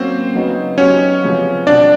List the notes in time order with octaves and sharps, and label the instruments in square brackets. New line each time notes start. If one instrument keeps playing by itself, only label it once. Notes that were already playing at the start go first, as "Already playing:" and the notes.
Already playing: [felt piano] F#3 A#3 C#4 [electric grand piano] C4 C5
[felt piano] C#3 F#3 B3 D#4
[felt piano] F#3 B3 D#4 G4 [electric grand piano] C#4 C#5
[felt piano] C3 F3 G#3 B3
[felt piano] B2 G3 C4 [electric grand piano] D4 D5